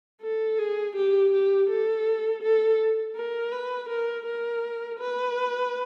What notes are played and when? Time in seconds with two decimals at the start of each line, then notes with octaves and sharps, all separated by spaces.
0.22 A4
0.58 G#4
0.96 G4
1.33 G4
1.70 A4
2.42 A4
3.16 A#4
3.52 B4
3.89 A#4
4.26 A#4
5.00 B4